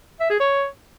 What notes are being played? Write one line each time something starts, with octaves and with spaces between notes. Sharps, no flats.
E5
G#4
C#5